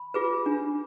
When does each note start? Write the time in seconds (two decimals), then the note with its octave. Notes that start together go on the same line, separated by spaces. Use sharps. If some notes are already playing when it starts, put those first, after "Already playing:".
Already playing: B5
0.14 F4 G#4 B4
0.46 D4